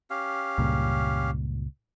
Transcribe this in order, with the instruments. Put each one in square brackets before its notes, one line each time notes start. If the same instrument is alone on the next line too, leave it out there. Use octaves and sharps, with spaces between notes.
[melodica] C#4 G4 F5
[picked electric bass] C#2 G2 A#2